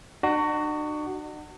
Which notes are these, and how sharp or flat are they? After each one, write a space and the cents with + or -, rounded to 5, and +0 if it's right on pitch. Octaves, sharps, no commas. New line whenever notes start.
D4 +45 F#4 +15